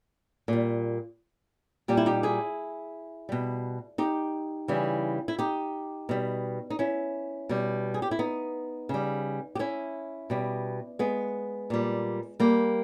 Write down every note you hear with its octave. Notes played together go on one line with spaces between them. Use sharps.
A#2 G3
A#2 G3 G4
E4
D#4 G4
E4 G#4
B2 G3
D#4 G4
C#3 E3 G3
E4
D#4 G4
B2 G3
D#4
C#4 E4
B2 G3
G#4
G4
E4
B3 D#4
C#3 G3
G4
C#4 E4
B2 G3
G#3 B3
A#2 G3
G3 A#3